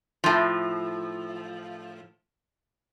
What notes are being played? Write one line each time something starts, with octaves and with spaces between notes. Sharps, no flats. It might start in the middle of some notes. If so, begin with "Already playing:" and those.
A2 F3